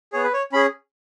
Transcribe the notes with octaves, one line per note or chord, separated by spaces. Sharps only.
B3 G#4 C#5
B4
C#5
C#4 G#4 B5